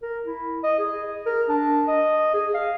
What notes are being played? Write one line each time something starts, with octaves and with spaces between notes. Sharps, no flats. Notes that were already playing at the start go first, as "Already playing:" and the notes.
A#4
E4
D#5
G#4
A#4
D4
D#5
G#4
F5